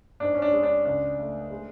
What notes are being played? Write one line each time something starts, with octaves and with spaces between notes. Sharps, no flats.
G#2 D4
C#4
D4
G#3
D4
C#2 D4
A3
G#3